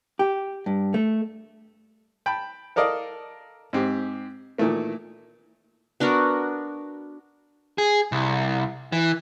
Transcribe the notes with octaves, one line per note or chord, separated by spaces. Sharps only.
G4
G2
A3
G5 A5 B5
A4 A#4 D5 D#5 F5
G#2 C4 G4
A#2 D#3 E3 A3 A#3
B3 D4 F#4 A#4
G#4
C2
E3